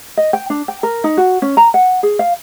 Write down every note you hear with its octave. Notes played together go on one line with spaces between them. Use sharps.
D#5
G5
D4
G5
A#4
D#4
F#4
C#4
A#5
F#5
G#4
F5